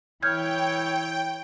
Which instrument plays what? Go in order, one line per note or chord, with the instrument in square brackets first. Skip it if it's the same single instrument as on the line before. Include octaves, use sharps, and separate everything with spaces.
[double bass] E3 E4 [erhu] C#5 [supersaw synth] G5 [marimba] F6 G6 G#6